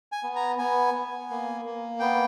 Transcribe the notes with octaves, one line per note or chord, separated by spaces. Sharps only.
G#5
B3
A#5
B3 G#5
B3
A#3
A#3
B3 G5